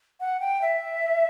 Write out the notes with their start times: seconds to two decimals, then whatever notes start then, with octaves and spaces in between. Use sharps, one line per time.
0.20 F#5
0.40 G5
0.61 E5